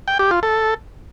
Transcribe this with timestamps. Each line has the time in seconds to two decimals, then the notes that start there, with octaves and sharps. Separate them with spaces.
0.08 G5
0.19 G4
0.31 F4
0.43 A4